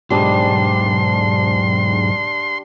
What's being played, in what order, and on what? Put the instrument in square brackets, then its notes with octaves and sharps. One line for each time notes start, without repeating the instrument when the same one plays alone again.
[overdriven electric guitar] B1 G#2 [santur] G3 D4 D#6 [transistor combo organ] C6